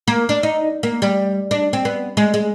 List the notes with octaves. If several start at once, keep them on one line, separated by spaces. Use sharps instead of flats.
A#3
D4
D#4
A#3
G3
D4
C4
B3
G#3
G#3